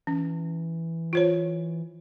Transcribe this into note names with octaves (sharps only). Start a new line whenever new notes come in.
E3 C#4
F4 C5 C#5